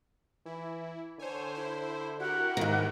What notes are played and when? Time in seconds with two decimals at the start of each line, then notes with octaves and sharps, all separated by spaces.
0.46 E3 E4
1.19 D3 C5 C#5 G#5
1.55 E4 C5
2.20 E4 F#4 G4 A#4 F#5
2.57 G#2 D#3 A#3